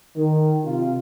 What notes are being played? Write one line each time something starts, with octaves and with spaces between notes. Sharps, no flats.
D#3
C3 F4